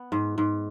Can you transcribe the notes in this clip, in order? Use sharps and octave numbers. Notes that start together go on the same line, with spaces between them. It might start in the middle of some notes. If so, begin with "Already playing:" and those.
Already playing: B3
G#2
G#2